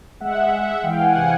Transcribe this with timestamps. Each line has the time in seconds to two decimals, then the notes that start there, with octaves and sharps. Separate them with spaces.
0.21 G#3 E5 F#5
0.43 E5 F#5
0.53 G#3
0.62 E5 F#5
0.83 E3 F5 G5
1.00 F#5 G#5
1.15 C3 F#5 G#5